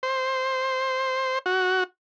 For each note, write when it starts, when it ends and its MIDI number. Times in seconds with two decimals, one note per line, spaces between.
0.03 1.39 72
1.46 1.84 66